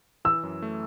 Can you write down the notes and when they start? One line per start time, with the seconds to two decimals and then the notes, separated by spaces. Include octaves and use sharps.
0.25 E3 E6
0.43 F#2
0.62 A3